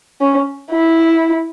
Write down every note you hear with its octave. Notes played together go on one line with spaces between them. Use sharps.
C#4
E4